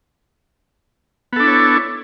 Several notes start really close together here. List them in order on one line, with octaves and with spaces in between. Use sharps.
B3 A4 D4 E4 C#5